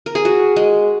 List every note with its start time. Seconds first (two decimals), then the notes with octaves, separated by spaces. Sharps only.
0.06 A#4
0.15 G#4
0.25 F#4
0.56 G#3